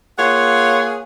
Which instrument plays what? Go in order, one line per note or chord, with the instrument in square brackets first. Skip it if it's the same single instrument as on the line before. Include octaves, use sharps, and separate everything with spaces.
[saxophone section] A#3 F4 G#4 C#5 F5 F#5